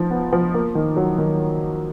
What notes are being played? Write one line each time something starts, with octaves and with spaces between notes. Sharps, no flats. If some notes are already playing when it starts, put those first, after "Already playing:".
Already playing: F3 D#4
B3
F3
A#3
D#3
F#3
D#3